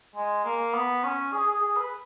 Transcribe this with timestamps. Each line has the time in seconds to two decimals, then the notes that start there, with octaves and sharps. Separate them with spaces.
0.16 G#3
0.45 A#3
0.74 B3
1.04 C#4
1.33 G#4
1.47 G#4
1.62 G#4
1.76 B4